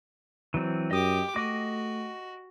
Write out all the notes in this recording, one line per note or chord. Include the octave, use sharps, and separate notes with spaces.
E3 F#3 C4
F#2 G4 D#5 D6 D#6
A3 F#4 D#5 D6